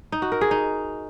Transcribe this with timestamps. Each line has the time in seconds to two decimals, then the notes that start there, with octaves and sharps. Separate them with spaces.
0.12 D#4
0.22 F#4
0.32 A#4
0.41 G#4
0.51 D#4